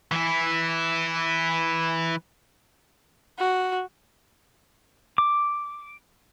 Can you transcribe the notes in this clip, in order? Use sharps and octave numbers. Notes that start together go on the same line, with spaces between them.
E3 E4
F#4
D6